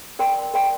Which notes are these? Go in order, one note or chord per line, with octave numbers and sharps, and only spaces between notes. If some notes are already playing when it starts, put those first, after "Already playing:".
A#4 D5 G5 C6
A#4 D5 G5 C6